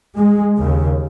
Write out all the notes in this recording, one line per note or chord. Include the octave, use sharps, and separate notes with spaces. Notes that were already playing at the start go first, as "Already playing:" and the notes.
G#3
D#2 C#3